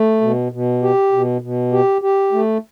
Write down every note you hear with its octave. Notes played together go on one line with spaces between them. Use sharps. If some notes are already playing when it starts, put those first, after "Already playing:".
Already playing: A3
B2
B2
G4
B2
B2
G4
G4
A3